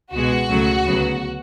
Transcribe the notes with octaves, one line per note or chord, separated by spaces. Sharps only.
C#2 B2 G#3 F#4
C#2 C#3 F#3 A3
D2 C#3 F#3 B3